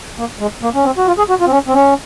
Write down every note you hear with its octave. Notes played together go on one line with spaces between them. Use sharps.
A#3
G#3
A#3
C#4
C4
F#4
F4
G#4
F#4
F4
C4
C#4
C4
C#4